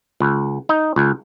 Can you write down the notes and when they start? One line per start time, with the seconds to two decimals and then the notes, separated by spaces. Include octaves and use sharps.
0.20 C#2
0.69 D#4
0.96 C#2